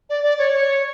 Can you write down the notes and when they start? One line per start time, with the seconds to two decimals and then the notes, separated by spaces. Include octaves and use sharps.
0.09 D5
0.23 D5
0.38 C#5
0.53 C#5